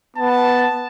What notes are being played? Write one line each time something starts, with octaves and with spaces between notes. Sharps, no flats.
B3 A5